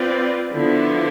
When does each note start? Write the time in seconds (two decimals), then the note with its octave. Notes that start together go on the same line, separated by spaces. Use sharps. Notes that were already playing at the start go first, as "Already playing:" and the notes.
Already playing: C4 F4 B4 D5
0.52 D3 F3 B3 E4